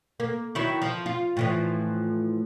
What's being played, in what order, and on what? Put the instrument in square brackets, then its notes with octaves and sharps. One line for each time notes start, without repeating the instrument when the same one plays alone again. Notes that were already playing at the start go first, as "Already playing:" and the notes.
[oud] A#3
D#3 F#3 E4
F3
F4
A2 E3 F3